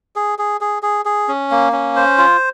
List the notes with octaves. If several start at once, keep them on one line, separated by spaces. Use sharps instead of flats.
G#4
G#4
G#4
G#4
G#4
C#4
A#3
C#4
C5
F4